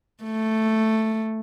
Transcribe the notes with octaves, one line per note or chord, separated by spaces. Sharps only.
A3